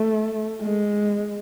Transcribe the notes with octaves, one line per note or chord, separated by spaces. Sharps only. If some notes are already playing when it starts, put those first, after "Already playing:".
Already playing: A3
G#3